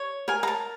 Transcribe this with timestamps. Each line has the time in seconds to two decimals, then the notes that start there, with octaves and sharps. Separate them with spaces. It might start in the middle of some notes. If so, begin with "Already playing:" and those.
Already playing: C#5
0.28 A#4 G#5
0.43 A#5
0.48 A5